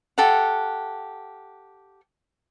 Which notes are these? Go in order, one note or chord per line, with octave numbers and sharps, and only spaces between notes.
G4 A4 F5 F#5